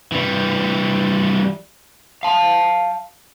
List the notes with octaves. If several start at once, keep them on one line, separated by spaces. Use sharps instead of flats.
E3 G3
F5 A5